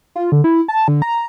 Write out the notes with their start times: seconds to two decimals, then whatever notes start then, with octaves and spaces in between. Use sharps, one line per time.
0.16 F4
0.32 D3
0.44 E4
0.68 A5
0.88 D3
1.02 A#5